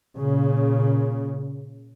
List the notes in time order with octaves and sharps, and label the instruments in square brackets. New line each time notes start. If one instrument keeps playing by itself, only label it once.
[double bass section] A#2 C#3